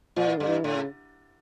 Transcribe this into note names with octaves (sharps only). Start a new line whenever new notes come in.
A#2 F3
E3
G2 D3
E3
A2 D3
C#3